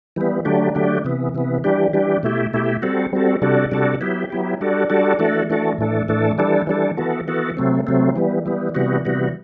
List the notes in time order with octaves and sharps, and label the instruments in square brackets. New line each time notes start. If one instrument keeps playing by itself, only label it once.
[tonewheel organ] E3 G3 B3
D3 F#3 A3 D4 G4
D3 F#3 A3 D4 G4
C3 E3 B3
C3 E3 B3
E3 G3 D4 G4
E3 G3 D4 G4
B2 A3 E4 G4
B2 A3 E4 G4
G3 C4 F#4 A4
G3 C4 F#4 A4
C3 G3 D4 F#4 A4
C3 G3 D4 F#4 A4
F#3 B3 E4 G4
F#3 B3 E4 G4
G3 D4 F#4 A4
G3 D4 F#4 A4
E3 A3 D4 F#4 A4
E3 A3 D4 F#4 A4
A2 E3 A3 D4 A4
A2 E3 A3 D4 A4
E3 G3 D4 A4
E3 G3 D4 A4
E3 B3 F#4 A4
E3 B3 F#4 A4
C3 F#3 A3 C4
C3 F#3 A3 C4
E3 G3 B3
E3 G3 B3
C3 E3 G3 B3 F#4
C3 E3 G3 B3 F#4